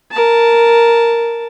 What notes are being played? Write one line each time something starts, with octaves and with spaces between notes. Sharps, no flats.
A#4 A5